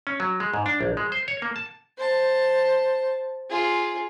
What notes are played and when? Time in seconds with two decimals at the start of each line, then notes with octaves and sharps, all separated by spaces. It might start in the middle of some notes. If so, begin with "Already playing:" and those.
0.07 C#4
0.20 F#3
0.40 G#3
0.54 G#2
0.66 D4
0.81 A#1
0.97 G#3
1.12 C5
1.28 C#5
1.42 A#3
1.56 A5
1.97 C5 A5
3.49 F4 G#4